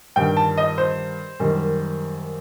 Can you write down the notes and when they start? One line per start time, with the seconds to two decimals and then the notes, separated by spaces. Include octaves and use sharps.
0.16 G2 D#3 G3 G5
0.37 A5
0.58 D#5
0.78 C5
1.40 F#2 D#3 G3